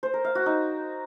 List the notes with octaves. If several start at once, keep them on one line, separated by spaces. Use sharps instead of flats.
C5
A#4
F5
F#4
D#4